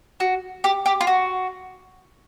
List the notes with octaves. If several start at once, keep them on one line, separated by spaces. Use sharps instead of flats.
F#4
G4
G4
F4
F#4